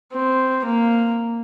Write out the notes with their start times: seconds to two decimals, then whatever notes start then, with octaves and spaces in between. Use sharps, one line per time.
0.13 C4
0.65 A#3